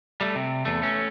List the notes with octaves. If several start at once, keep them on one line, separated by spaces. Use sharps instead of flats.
G3 A3
C3
E2 A3
A3 C#4